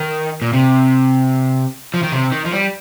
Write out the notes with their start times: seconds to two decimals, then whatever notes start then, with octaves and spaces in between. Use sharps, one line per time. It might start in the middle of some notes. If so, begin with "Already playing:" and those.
Already playing: D#3
0.42 A#2
0.53 C3
1.94 F3
2.03 D#3
2.12 C3
2.32 D#3
2.45 F3
2.52 G3